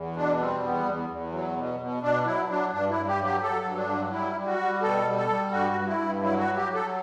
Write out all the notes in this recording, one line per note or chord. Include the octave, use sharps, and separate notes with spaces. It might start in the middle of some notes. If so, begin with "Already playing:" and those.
Already playing: E2
B2 D4
G3 C4
E2 B3
E2
E2
F#3
B2
B2
B2 D4
F#3 E4
F#3 D4
G2 D4
E4
G2
G4
F#3
G4
F#3 A4
G2
D4
F#3
G3 E4
G3
F#4
G3
B2 A4
G3
A4
G3
G2 F#4
G2
E4
G2
F#3 E4
F#4
F#3
G4
F#3
A4